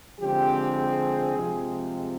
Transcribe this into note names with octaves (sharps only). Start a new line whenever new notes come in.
D3 F3 G#3 C4 G4
G#4
C3 F3 G#3 C4